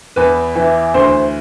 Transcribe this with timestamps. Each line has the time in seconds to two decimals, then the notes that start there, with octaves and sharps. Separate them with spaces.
0.16 E2 B4
0.56 E3
0.94 D2 C5